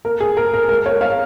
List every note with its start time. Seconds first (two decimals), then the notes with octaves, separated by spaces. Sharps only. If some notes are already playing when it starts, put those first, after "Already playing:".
0.05 A#3 A#4
0.20 G#4
0.37 A#3 A#4
0.54 A#4
0.69 G#3 A#4
0.86 A#4 C#5
1.01 G#3 C#5 F5